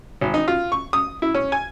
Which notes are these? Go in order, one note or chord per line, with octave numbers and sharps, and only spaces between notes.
G#1
D#4
F4
C#6
D#6
E4
C#4
G#5